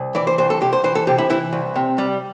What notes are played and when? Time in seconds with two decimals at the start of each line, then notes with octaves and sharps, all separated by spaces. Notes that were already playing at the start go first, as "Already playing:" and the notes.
Already playing: C2
0.15 E3 D5
0.27 C5
0.38 C2 C5
0.50 A4
0.61 C2 G4
0.73 C5
0.84 E3 C5
0.95 A4
1.07 C3 G4
1.18 E4
1.30 E3 E4
1.53 C2
1.76 C3
1.98 G3